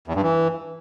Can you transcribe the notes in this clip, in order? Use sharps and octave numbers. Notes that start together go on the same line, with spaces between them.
E2
G2
E3